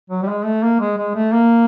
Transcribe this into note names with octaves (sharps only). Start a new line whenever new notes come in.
F#3
G3
G#3
A3
A#3
G#3
G#3
A3
A#3